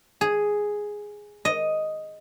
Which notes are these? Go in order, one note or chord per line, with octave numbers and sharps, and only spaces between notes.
G#4
D#5